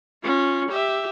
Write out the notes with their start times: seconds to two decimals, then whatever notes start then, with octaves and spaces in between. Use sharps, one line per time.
0.23 C#4 F4
0.69 G4 E5